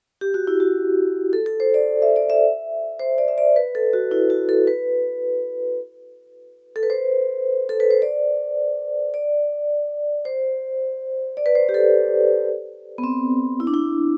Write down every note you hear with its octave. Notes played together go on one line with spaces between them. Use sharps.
G4
F#4
E4
F#4
A4
A4
C5
D5
E5
D5
E5
C5
D5
E5
D5
B4
A4
F#4
E4
F#4
A4
B4
A4
B4
C5
A4
B4
C5
D5
D5
C5
D5
B4
C5
G4
A4
B3
C4
E4
D4
E4